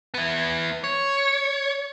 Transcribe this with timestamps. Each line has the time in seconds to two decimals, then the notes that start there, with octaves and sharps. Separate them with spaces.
0.14 B3 E4
0.84 C#5